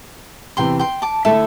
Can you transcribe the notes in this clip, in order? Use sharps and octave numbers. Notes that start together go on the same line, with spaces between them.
E2 C3 E3 G5 C6
G5 C6
A5 D6
D3 A3 E4 E5 A5